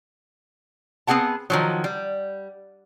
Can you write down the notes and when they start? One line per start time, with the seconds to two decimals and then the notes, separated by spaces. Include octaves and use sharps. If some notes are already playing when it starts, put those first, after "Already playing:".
1.07 B3 C4 G#4 F#5 A5
1.50 D#3 F3 F#3
1.84 G3